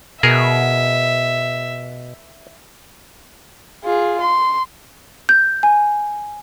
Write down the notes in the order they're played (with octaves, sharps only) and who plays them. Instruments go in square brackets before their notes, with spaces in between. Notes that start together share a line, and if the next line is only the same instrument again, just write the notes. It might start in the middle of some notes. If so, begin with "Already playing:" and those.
[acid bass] B2 [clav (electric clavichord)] G#4 A#4 [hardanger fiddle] E5
[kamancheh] F4 G#4
C6
[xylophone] G6
G#5